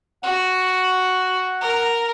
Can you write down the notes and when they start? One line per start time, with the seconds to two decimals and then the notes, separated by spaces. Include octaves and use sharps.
0.23 F#4 F#5
1.61 A#4